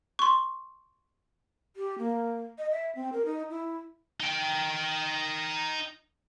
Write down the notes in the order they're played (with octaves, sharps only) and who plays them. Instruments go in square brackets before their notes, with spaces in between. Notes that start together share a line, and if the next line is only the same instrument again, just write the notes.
[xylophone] C6 C#6
[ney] G4
A#3
D#5
E5
C4
A#4
D#4
E4
[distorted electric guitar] D#4 G5